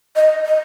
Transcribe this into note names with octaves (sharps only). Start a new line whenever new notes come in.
D#5
D#5